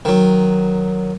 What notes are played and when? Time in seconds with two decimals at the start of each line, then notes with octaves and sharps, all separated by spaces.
0.05 D#3 F#3